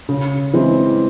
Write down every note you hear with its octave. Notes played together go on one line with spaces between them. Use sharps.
C#3
E3 G#3 C4